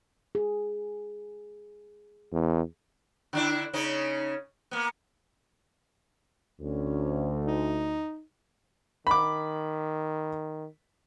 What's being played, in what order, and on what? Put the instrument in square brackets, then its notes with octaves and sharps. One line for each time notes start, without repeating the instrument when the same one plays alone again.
[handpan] G#4
[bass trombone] E2
[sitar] D3 D4 E4
C#3 C#4 D#4
A#3 B3
[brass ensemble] D2 [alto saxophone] C#4
[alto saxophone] D#4
[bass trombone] D#3 [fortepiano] B5 D6